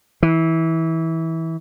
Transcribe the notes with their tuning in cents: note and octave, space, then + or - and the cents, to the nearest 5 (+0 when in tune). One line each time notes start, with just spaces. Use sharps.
E3 -20